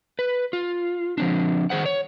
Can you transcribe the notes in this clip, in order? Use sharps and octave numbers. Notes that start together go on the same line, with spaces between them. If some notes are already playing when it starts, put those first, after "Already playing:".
B4
F4
F3 C4 D4
D#3 G#4 C5 F#5
C#5